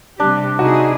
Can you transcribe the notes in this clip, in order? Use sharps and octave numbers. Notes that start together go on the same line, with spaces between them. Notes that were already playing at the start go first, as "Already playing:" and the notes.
C3 G3 D4 G4
C3 D#4 E4 F#4 G#4